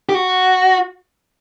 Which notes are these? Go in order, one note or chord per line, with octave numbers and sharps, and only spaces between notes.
G4
F#4